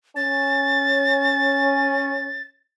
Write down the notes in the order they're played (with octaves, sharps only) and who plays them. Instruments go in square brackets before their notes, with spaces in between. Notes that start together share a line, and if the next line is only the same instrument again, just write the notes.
[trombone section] C#4 [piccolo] A6